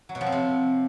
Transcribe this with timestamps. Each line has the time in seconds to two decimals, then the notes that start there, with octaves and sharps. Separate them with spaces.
0.09 F#3
0.15 B2
0.21 F3
0.26 C4
0.32 C3